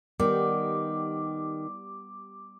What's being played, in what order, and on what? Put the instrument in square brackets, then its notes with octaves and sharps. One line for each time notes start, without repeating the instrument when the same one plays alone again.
[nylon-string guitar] D#3 [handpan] G3 B3 G4 [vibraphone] D6